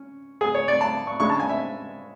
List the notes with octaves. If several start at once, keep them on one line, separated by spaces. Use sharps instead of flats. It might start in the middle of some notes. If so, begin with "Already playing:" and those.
Already playing: C#4
G#4
C#5
D5
A5
C#6
D3 G#3 C#4 E4 C#6
A5
G#5
E5